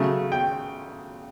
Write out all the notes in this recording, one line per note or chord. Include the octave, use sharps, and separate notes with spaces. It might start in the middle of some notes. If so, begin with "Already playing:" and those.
Already playing: C#3 F#3 A3
G5